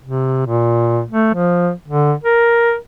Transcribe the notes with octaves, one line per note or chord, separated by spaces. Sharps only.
C3
A#2
A3
F3
D3
A#4